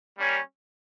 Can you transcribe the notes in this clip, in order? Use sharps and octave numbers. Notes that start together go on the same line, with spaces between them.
G3 A#3 C#4